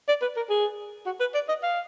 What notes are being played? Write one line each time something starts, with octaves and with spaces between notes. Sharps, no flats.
D5
B4
A#4
G#4
F#4
B4
D5
D#5
F5